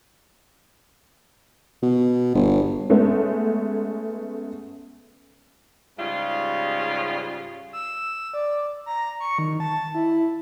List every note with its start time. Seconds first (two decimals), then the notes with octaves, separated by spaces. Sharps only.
1.83 B2
2.35 G1
2.90 G#3 A3 B3 C#4
5.98 G#2 C#3 G3 F4
7.73 E6
8.33 D5
8.86 A#5
9.20 C#6
9.39 D#3
9.60 A5
9.95 E4